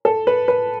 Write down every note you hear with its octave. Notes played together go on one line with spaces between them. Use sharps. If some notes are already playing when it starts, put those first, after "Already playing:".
A4
B4
B4